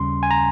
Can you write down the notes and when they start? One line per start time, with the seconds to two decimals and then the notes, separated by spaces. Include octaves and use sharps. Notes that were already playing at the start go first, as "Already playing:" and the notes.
Already playing: D#2 C#3 G3 C#4 C6
0.23 G#5
0.31 A#5